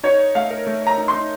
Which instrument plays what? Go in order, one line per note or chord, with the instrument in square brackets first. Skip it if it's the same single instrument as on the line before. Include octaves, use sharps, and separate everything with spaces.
[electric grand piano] D#4 [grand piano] C#5
[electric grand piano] C#5
[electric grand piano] A3 [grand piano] F5
[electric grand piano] A#4
A3
[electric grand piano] C#5 [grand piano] A#5
[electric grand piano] D#4
[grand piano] C6
[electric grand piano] D#4